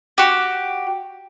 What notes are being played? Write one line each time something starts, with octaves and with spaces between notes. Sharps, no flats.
F#4 G4